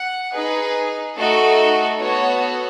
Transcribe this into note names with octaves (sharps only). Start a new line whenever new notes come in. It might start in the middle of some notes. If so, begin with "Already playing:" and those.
Already playing: F#5
D#4 G#4 B4
A3 D#4 F#4 A4
B3 F#4 A4 C#5